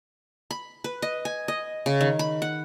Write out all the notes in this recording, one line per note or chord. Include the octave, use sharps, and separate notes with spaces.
B5
B4
D#5
G#5
D#5
C#3
D#3
B5
F#5